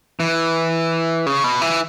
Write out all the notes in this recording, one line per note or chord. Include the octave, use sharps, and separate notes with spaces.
E3
C#3
B2
E3